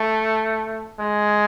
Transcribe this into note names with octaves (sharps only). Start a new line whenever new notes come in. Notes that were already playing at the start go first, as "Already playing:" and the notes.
Already playing: A3
G#3